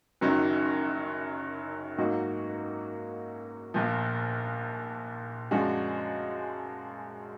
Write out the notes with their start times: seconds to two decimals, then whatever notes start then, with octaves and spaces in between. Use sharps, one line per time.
0.21 F#1 F#2 D#3 F#3
1.98 G#2 F#3 A#3 D#4 F#4
3.74 A#1 A#2 F3
5.51 F#2 F3 G#3 D4 F#4